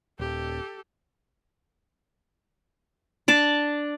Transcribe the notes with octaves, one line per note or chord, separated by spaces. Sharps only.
D#1 G4 A4
D4 D5 A5